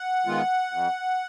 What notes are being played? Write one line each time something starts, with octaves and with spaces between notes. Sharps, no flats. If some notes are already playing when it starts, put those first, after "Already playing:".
Already playing: F#5
D#3 G#3 B3 F4
F2